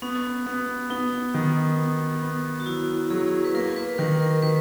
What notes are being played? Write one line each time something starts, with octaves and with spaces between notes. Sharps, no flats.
B3 C#4
B3
B3 D#4
D#3
B3
B3
F#4
F#3 E4
F#3 G#4
B4
A#3 A#4
B4
D#3 A#4
A#4
D#3 B4